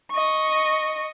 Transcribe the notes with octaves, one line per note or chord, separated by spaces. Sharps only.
D#5 C#6